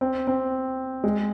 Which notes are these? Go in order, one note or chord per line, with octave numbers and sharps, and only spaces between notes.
C4
C4
G#3